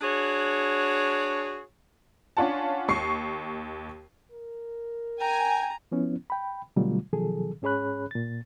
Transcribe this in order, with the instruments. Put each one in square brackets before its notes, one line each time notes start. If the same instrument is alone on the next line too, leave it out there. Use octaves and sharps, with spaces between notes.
[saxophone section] D4 F#4 G#4 C#5
[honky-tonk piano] C#4 D4 F4 F#5 A5
D#2 C#6 C7
[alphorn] A#4
[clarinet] G5 [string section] G#5 [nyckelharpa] A#5
[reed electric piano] F3 B3 C#4 E4
G5 B5
B2 D3 F#3 G3 A3 F4
B2 D#3 F3 F#3 G#4 A4
G#2 C#4 G#4 C#5 B5 F#6
A#2 A6